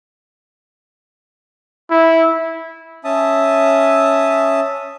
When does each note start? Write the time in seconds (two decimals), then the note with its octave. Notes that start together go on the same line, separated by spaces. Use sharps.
1.90 E4
3.04 C#4 E5 A5 D#6